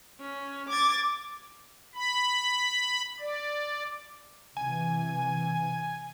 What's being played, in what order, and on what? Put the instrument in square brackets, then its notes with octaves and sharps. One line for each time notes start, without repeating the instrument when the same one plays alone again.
[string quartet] C#4
D6 G#6 A6
[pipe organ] B5
D5
[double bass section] C3 E3 [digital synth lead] G#5